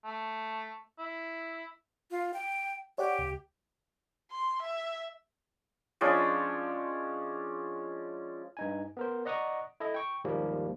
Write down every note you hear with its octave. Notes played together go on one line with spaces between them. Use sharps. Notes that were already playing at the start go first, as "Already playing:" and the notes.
A3
E4
F4
G5
G4 C#5 D5 F#5
C#2
C6
E5
F3 G#3 C#4 D4
G2 D#4 G#5
B3 A#4 C5
D5 D#5 F#5 A#5 C#6 D#6
E4 A4 D#5
G5 C#6
D#2 G#2 F3 G3 A#3